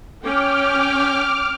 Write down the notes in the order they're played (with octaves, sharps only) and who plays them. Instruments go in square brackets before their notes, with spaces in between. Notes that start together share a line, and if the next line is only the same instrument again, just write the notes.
[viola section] C#4 G5 [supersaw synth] D6 F6